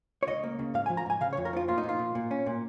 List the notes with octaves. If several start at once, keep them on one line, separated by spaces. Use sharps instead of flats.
C#5
C#2 D#5
A#3
C#3
G#2 F5
G#5
F3
A#5
G#2 G#5
C#3 F5
C#5
F2
A#4
F3 F4
A#2 F4
D#4
A#2
F4
A#2
A#2
C#4
A#2